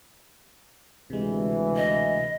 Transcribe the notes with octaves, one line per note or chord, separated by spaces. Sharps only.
D2 C3 E3 G#3
D#5